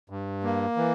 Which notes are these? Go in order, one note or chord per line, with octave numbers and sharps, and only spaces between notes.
G2
A#3
E3